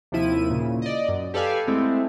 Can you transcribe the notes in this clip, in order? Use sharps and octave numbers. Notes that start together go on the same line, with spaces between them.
D#2 C3 F3 E4 D#7
A#2 C#3
D5 D#5
F#2
G4 A4 B4 D5 F5 G#5
G#3 A3 C4 E4